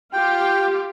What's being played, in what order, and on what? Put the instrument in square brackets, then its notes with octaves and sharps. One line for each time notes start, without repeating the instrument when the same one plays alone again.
[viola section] F4 G4 [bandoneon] G5